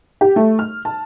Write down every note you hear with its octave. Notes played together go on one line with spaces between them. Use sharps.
G4
A3
F6
A5